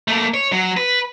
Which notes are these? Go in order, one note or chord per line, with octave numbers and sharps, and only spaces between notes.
A3 A#3
C#5
F#3
B4